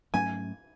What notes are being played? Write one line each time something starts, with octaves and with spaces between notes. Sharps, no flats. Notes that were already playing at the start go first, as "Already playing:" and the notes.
G#2 F#3 A3 C#4 G#5